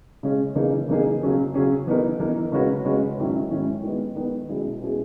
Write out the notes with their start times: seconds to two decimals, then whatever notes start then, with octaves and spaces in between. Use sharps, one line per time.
0.23 C#3 G#3 C#4 G#4
0.55 C#3 E3 A#3 D#4 G#4
0.89 C#3 E3 A#3 D#4 G#4
1.21 C#3 F#3 C#4 G#4
1.54 C#3 F#3 C#4 G#4
1.87 E3 B3 D#4 A#4
2.19 E3 B3 D#4 A#4
2.52 C#3 G#3 C#4 F#4 B4
2.85 C#3 G#3 C#4 F#4 B4
3.18 G#2 D#3 F#3 C#4 E4
3.51 G#2 D#3 F#3 C#4 E4
3.84 D#3 G#3 B3
4.16 D#3 G#3 B3
4.49 B2 G#3 C#4 E4 G#4
4.82 B2 G#3 C#4 E4 G#4